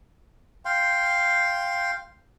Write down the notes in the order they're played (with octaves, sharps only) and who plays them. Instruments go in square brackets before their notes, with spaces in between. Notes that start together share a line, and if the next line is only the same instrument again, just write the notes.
[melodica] F5 G5 C6